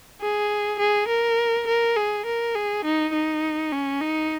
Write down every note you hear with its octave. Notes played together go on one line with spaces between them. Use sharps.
G#4
G#4
A#4
A#4
G#4
A#4
G#4
D#4
D#4
C#4
D#4